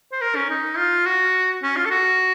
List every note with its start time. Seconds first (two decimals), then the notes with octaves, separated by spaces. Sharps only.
0.12 C5
0.21 A#4
0.36 C#4
0.49 D#4
0.78 F4
1.06 F#4
1.63 C#4
1.77 F4
1.85 A4
1.91 F#4